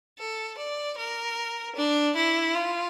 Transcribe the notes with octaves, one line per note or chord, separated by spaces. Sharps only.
A4
D5
A#4
D4
E4
F4